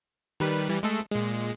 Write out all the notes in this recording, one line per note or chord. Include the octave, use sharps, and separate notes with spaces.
D#3 G3 B4
E3 G3
G#3 A3 A4
A#2 G#3